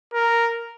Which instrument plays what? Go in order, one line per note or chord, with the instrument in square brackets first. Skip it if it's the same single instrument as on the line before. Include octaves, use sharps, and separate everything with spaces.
[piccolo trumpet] A#4